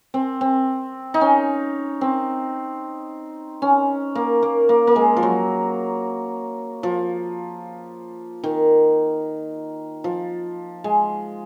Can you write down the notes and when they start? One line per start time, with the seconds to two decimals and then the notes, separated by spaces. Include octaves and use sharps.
0.14 C4
0.41 C4
1.14 D#4
1.21 C#4
2.01 C4
3.62 C#4
4.15 A#3
4.42 A#3
4.69 A#3
4.87 A#3
4.96 G#3
5.17 F3
5.23 F#3
6.83 F3
8.44 D#3
10.04 F3
10.84 G#3